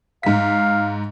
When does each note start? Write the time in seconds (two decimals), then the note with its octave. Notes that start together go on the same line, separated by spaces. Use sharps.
0.23 G#2 F5 B6